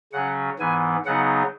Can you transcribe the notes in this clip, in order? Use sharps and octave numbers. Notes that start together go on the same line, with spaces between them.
C#3 F#3 C#4 F#5
G#2 E3 B3 G#5
C#3 F#3 B3 D#4 F#5